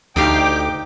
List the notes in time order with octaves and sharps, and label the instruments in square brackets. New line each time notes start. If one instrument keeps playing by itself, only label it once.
[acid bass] D2 [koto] D#4 G4 F5 [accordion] G5 D6